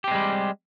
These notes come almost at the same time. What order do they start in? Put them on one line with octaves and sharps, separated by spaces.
G4 C4 G#3 G3